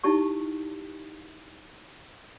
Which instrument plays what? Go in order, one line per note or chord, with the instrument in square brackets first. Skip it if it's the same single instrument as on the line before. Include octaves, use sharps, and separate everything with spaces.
[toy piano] D#4 E4 G4 A5 C#6